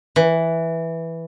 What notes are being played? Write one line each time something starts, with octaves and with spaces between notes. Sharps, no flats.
E3